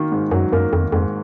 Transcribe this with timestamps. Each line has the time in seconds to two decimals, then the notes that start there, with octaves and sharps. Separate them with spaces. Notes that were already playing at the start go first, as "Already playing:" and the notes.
Already playing: D#3 A#3
0.12 G#2
0.31 F#2 F#3
0.52 F#2 A#3
0.73 F2 D#3
0.92 F2 G#2